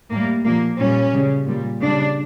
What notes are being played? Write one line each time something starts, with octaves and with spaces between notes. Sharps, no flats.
A2 G3 A#3
A#2 F3 A#3
A#2 G3 C#4
C#3 G3
A#2 G3
C#3 G3 D4